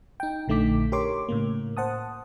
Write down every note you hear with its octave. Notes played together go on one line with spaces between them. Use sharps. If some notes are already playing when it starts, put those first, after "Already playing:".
D#4 G5
A#1 D3 A3 D#4 D6 B6
G4 A#4 C#5 C6 D6
A2 C#3 A#3
C5 F#5 A5 D#6